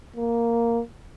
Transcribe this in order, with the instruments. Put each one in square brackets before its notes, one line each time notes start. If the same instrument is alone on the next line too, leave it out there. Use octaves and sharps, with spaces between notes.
[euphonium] A#3